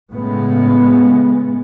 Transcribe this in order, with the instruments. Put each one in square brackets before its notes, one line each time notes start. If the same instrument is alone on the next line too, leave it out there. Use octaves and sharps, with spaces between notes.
[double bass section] A2 C#3 G#3 B3